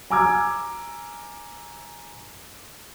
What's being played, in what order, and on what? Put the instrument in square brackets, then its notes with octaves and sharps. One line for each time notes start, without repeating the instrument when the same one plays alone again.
[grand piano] G#5 A#5 D6 E6 F6 G#6